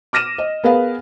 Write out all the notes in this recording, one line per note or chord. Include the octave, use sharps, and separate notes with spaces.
D6 F6 A#6 D#7 E7
D#5
B3 G#4 A#4 B4 F5